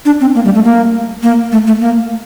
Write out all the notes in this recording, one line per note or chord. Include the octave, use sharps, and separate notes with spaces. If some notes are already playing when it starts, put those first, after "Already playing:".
D4
C4
A#3
G3
A3
A#3
A#3
A3
A3
A#3